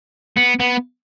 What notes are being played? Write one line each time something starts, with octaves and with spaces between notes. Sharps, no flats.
B3
B3